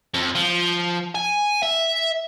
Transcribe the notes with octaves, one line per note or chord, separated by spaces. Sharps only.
F2
F3
G#5
E5